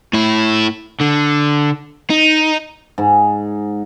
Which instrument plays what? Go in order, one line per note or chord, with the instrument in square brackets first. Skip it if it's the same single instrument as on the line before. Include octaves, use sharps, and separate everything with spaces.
[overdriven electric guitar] A2 E4
D3
D#4
[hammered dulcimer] G#2